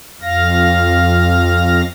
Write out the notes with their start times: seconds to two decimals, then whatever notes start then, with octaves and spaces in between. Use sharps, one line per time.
0.21 F2 F5 A#6